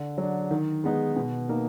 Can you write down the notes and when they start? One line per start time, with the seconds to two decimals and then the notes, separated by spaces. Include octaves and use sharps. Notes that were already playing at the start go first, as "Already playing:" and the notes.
Already playing: D3
0.18 F#3 D4
0.51 D#3
0.84 G#3 B3 D#4
1.16 B2
1.49 A#3 D#4